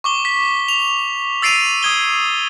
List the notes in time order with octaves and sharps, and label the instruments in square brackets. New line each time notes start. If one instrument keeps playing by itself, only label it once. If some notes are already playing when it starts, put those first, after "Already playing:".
[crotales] C#6 D6 G7
B6
F7
E6 A6 C7 D7 D#7 F7
D#6 G#6 G7